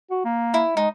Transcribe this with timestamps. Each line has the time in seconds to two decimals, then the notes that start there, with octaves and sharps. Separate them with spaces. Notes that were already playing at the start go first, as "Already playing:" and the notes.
0.11 F#4
0.25 A#3
0.54 E4
0.77 G#3 D#4